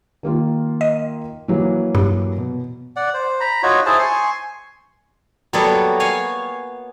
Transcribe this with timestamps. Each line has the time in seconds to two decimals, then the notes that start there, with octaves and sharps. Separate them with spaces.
0.23 D#3 A#3 F4
0.81 D#5
1.48 E3 F#3 A#3
1.95 G2
2.38 B2
2.96 D5 F#5
3.14 C5
3.40 A#5 B5
3.63 D#4 F4 F#4 C#5
3.86 E4 G#4 C5 A5
3.99 G#5 C6 C#6
5.53 F#3 G3 A#3 B3 A4 C#5
6.00 C#5 F5 G#5